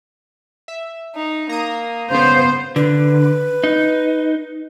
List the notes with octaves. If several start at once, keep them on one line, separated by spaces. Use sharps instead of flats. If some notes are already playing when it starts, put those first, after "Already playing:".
E5
D#4
A#3 A#5 D#6
C#3 B3 F4 C5
D3 B4
D#4